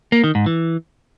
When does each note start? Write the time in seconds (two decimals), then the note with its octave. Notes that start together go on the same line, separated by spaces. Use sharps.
0.12 A#3
0.24 D#3
0.35 G#2
0.46 E3